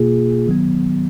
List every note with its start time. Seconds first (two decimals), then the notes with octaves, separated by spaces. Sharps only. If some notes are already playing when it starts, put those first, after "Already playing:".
Already playing: B2 A#3 F4 G#4
0.47 D#3 F#3 B3